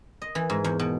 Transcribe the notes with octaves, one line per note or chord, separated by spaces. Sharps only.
D#5
E3
G#2
E2
B2